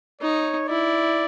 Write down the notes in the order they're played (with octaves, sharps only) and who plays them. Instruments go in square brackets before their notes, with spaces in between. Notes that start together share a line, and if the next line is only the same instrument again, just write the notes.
[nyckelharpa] D#4 [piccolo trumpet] C#5
[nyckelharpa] E4 [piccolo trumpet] D5